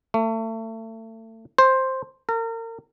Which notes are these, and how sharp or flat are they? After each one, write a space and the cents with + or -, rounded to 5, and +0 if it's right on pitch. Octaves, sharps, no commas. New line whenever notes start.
A3 +30
C5 +5
A#4 -35